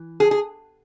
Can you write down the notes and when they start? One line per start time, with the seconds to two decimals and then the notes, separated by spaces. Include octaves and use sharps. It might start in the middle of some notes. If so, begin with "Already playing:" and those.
Already playing: E3
0.20 G#4
0.31 G#4